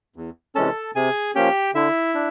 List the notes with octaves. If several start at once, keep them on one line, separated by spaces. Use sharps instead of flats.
E2
C3 E3 G#3 C#4 A4 A5
C3 G#4 G#5
F3 A#3 C#4 G4 G5
D3 E4 E5
D4